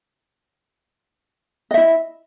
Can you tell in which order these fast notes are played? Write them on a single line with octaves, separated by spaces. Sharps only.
D#5 E5 E4